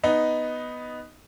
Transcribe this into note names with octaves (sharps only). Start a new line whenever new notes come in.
B3 D#4 D#5